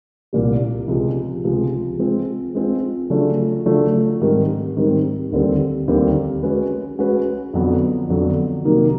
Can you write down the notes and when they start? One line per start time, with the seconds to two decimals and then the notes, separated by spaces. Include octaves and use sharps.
0.33 C2 A#2 G3
0.87 C#2 C3 F3 G#3
1.44 C#2 C3 F3 G#3
1.99 G#3 C4 F4
2.55 G#3 C4 F4
3.10 C#3 F#3 A3 D4 F4
3.65 C#3 F#3 A3 D4 F4
4.21 G#2 D#3 G3 C4
4.77 G#2 D#3 G3 C4
5.32 D#2 D3 G3 C4
5.88 D#2 D3 G3 C4
6.43 G#3 C#4 F#4 B4
6.99 G#3 C#4 F#4 B4
7.54 F2 D3 F#3 B3
8.09 F2 D3 F#3 B3
8.64 C3 D#3 F#3 A#3 D#4